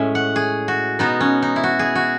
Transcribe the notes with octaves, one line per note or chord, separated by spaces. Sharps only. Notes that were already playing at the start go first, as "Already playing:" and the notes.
Already playing: A2 G#3 C#4 E5
F#5
G#4
F#4
B2 G#3 B3 D#4
C#4
D#4
E4
F#4
G#4
F#4